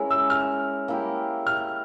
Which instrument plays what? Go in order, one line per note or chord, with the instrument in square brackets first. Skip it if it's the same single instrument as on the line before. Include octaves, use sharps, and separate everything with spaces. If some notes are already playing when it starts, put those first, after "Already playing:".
Already playing: [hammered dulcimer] G#3 C#4 E4 A#4
[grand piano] E6
F6
[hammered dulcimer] A#3 E4 G4
[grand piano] F6